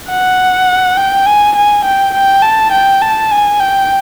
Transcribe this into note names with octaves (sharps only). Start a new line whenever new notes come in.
F#5
G5
G#5
G#5
G5
G5
A5
G5
A5
G#5
G5